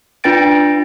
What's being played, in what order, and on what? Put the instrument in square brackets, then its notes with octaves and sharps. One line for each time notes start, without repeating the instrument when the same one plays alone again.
[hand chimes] D4 F4 B4 G5 A6 D7